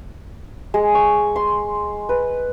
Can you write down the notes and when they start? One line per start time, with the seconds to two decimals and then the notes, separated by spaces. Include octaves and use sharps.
0.74 G#3
0.95 C#6
1.36 C6
2.09 B4